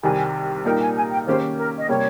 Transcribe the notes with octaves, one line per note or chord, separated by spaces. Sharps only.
C2 C3 D#3 G3 G#5
A#2 G3 A#3 D#4 A#4 G5
G#5
G#5
G5
D#3 A#3 C#4 G4 C5
A#4
D#5
C3 G3 A#3 C#5